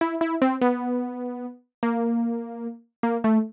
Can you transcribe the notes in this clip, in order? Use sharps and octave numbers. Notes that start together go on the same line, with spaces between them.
E4
E4
C4
B3
A#3
A#3
A3